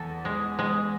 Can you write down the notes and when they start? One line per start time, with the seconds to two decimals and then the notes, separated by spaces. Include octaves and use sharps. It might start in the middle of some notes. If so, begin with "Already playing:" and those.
Already playing: E2 A4
0.25 G#3
0.59 G#3